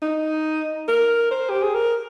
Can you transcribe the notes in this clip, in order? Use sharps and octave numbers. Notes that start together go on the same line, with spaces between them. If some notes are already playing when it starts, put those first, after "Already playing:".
D#4
A#4
C5
G4
G#4
A#4